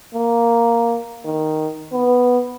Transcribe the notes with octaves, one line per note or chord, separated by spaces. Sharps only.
A#3
D#3
B3